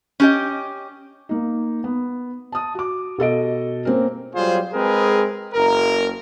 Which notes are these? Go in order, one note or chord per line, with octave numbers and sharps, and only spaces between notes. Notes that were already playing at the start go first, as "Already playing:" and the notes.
C#4 G4 D#5
A#3 D#4
B3
A5 D#6
F#4 D6
B2 A4 D#5 D7
A#3 C4 C#4 A#4
F#3 G3 F4 G#4 C5
G#3 C4 G#4 A#4 B4
F#1 A#4